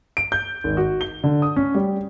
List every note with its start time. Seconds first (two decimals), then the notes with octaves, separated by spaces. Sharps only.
0.17 D7
0.32 G6
0.64 G#1
0.77 F#4
1.01 G7
1.24 D3
1.42 D#6
1.56 C#4
1.75 G3